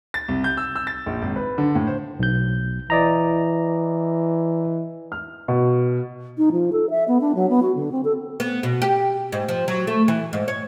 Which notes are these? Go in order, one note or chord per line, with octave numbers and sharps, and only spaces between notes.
A6
C2
G6
E6
E6
A6
A#1
G#1
B4
D3
A2
C5
B1 G6
E3 D5 D#5 A#5
F6
B2
D#4
F3
A4
E5
B3
D4
F#3
B3
F#4
D3
C4
A4
B3
B2
G4
G#2
F3
F#3
A3
E3
G#2
C#5